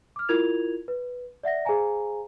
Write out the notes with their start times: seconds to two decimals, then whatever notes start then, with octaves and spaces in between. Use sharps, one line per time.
0.16 D6 F6
0.29 E4 F4 A#4 G#6 F7
0.88 B4
1.43 D5 E5 F#5 A#6
1.65 G#4 C5 F5 G#5 A#5